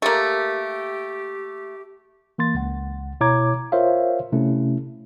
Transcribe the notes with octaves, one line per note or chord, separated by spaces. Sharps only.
A3 A#3 G4
E3 A#3 C6 A6
C#2 F#5
B2 E4 C#5 A#5 D6 G#6
F4 A#4 C5 C#5 E5 F5
C3 A3 C#4 E4